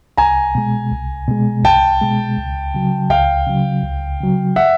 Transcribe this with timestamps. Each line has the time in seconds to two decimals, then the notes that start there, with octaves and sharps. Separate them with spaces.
0.17 C2 G#5 A#5
0.55 B2 G#3
0.91 C2
1.28 B2 G#3
1.64 C2 G5 A5
2.01 B2 G#3
2.38 C#2
2.75 C#3 F#3
3.10 C#2 F5 G5
3.47 C#3 F#3
3.84 C#2
4.21 C#3 F#3
4.56 E5 F#5